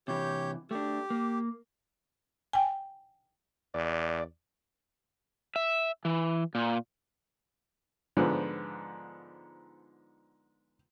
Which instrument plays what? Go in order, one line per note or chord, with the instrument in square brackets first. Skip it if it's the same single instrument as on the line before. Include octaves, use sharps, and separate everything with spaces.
[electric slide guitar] C3 E3 [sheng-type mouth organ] G4 C#5 G6
[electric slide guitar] A3 D4 [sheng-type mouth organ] G4
[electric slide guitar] A#3
[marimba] G5 G#5
[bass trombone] E2 [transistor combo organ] D5
[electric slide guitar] E5
E3
A#2
[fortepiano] G#2 D3 F3 B3